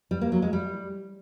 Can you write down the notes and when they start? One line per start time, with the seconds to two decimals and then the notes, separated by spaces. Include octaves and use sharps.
0.11 G3
0.21 A#3
0.32 F#3
0.42 G#3
0.53 G3